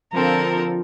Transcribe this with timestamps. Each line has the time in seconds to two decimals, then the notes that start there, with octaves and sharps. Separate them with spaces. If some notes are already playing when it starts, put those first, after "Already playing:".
0.13 D3 F3 C4 A4 A#4